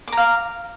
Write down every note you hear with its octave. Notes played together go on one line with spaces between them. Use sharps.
F5 A#5 D6